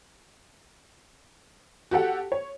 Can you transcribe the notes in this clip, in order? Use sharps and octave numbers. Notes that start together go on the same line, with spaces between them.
F#4 G4 A4 F#5
C#5